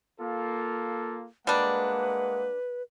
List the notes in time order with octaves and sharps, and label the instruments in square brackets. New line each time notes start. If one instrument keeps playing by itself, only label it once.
[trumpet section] A#3 F4 A4
[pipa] G3 D4 [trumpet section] G#3 A#3 F#5 [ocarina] B4